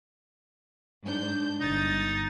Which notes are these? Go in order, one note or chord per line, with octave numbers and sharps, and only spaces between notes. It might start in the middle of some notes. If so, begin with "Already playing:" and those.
G#2 D4 G6
G1 D#4 A6